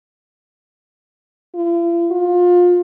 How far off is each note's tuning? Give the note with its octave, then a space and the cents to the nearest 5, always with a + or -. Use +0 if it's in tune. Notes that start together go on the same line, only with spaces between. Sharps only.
F4 -45
F4 +25